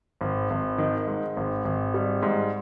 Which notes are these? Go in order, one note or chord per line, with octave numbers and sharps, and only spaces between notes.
G#1
G#1
D#3
G#2
G#1
G#1
G3
G#2